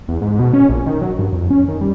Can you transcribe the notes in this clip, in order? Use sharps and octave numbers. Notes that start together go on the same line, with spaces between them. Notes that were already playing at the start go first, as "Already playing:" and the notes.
E2
G#2
B2
C#4
A#1
D#3
F#3
G2
F2
C#4
D#3
G3